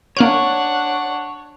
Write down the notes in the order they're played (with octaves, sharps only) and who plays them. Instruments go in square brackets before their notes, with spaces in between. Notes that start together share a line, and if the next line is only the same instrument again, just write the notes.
[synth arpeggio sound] A#3 F6 D7 [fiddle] D4 F#5 [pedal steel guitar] C#5